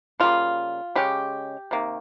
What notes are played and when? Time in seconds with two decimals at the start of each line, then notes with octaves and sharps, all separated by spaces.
0.20 C#3 G3 A#3 F4
0.95 C#3 G#3 C#4 G4
1.71 C3 D#3 A#3